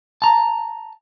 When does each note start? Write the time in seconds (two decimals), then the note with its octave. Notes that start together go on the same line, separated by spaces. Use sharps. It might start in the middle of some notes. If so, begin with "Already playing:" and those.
0.22 A5 A#5